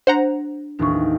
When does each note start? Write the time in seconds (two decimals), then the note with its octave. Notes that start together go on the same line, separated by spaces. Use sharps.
0.07 D4 C5 F#5 A#5
0.79 A1 D#2 C4 D4 C#6